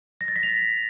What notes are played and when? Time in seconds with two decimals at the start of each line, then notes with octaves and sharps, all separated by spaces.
0.21 A#6
0.28 A6
0.36 B6
0.43 F7